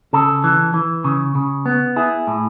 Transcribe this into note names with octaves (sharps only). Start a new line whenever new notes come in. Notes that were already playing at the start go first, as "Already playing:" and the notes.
C#3 A4
E3
E3
C#3
C#3
B3
E4 G#4
A2